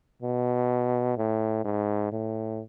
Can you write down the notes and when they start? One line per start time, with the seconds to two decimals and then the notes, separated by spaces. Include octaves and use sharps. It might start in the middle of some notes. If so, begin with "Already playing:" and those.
0.22 B2
1.17 A2
1.64 G#2
2.12 A2